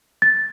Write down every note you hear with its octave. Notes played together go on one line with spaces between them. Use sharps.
A6